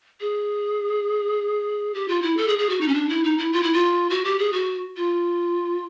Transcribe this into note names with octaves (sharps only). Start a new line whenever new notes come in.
G#4
G4
F4
E4
A4
G#4
G#4
F#4
D#4
C#4
D4
E4
D#4
E4
F4
E4
F4
F#4
G4
G#4
F#4
F4